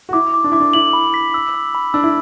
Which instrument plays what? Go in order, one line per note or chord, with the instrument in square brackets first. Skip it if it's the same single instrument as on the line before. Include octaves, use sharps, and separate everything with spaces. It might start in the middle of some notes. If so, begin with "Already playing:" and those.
[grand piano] F#4
[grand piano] E4 [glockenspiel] D6
[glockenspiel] D6
[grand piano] D4
[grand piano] E4 [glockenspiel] D6
[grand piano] D4
[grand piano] E4 [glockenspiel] F#7
[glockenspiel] B5
B6
E6
E6
B5
[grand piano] D4 [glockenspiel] E6
[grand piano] E4